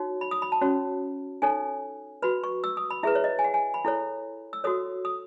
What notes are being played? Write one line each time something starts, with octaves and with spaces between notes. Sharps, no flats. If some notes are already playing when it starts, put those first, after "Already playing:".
Already playing: D#4 F#4 C#5
B5
D#6
B5
A5
C#4 F#4 C#5
D#4 A4 C#5 G#5
F#4 B4 B5
C#6
E6
D#6
B5
E4 G#4 B4 E5
C#5
D#5
G#5
F#5
G#5
B5
E4 A4 C#5
E6
F#4 A4 C#5 D#6
D#6